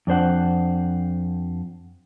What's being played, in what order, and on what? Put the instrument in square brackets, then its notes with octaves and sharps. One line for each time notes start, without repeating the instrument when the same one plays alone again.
[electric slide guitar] F2 D4 C5 F#5